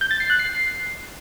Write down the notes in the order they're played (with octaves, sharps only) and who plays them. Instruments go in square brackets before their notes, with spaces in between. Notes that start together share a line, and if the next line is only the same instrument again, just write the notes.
[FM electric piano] G6
A6
C7
F#6
C7